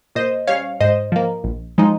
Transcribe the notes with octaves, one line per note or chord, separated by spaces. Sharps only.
A#2 C5 D#5
G3 C#4 C#5 F5
G#2 C5 D#5
F3 A#3
A#1
F3 G#3 D#4